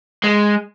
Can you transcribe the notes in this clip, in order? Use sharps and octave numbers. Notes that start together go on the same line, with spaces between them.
G#3